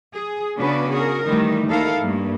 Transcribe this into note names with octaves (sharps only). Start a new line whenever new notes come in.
G#4
C#3 B3 D4 F#4 B4 D5
F#4 G#4 A#4
D#3 E3 G3 A3 D#4
D#2 D#4 E4 A4 A#4 F5
G2 A3 A#3